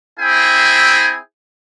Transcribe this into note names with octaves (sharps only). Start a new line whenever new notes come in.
C4 E4 G#4 E5 G5 G#5